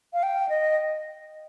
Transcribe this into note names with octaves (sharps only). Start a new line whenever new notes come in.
F5
G5
D#5